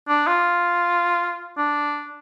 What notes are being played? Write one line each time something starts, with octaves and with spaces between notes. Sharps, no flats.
D4
F4
D4